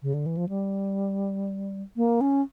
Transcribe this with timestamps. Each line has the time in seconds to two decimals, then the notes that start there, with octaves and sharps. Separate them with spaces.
0.03 C#3
0.14 D3
0.26 E3
0.37 F3
0.49 G3
1.96 A#3
2.21 C#4